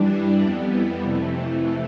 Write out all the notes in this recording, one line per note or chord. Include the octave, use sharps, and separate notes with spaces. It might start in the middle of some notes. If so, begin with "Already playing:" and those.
Already playing: G2 E3 G3 D4
F2 E3 G3 B3
F2 C3 E3 A3